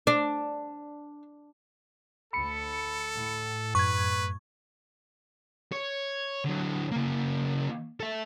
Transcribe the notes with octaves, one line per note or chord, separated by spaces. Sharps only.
D4
D2 A4 B5 C#7
A2
F#2 B4 C#6 G#6
C#5
D3 F#3
C#3 A#3
A4 E5